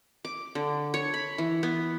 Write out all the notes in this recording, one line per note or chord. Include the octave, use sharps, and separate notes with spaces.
D6
D3
C#5
B5
E3
B3